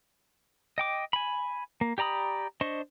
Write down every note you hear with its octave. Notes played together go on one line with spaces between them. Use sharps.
D#5 G5 D6
G#5 B5
A#3
G4 D5 A#5 B5 D#6
D4 C5 D#5 C#6